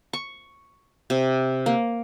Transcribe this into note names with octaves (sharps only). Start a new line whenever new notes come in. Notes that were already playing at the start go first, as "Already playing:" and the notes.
C#6
C3
A#3